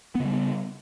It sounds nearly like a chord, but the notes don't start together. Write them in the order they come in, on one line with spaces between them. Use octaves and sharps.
B3 C#3 G3